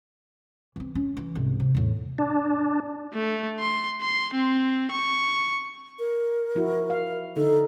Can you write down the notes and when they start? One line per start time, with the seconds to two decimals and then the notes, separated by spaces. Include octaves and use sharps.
0.76 E3 C4
0.95 C#4
1.17 E3
1.35 C2 G#2
1.60 C3
1.75 E2 A2
2.18 D4
3.14 A3
3.60 C6
4.01 C6
4.34 C4
4.92 C#6
5.99 A#4
6.55 F3 E4 F#4
6.90 F5
7.36 D3 D#4 A4